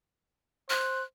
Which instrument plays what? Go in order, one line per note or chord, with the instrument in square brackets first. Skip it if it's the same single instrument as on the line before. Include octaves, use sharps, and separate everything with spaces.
[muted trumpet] C5 [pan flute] F#6